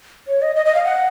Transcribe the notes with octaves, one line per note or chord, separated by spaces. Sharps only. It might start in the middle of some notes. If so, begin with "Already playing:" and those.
C#5
D#5
D#5
D#5
F5
F#5